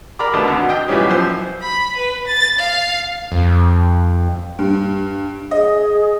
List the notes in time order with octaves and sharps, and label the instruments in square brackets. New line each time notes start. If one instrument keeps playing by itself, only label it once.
[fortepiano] A#4 D5 A#5 B5 D6
D#2 B2 D3 A3 D#5 A5
G#1 D2 D3
D#5 G5
B1 A#2 E3 G3 C#4 G4
F#2 F3 C5
[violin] B5
B4
A6
F5
[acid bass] F2
[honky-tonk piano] G2
[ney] G#4 [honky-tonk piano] D#5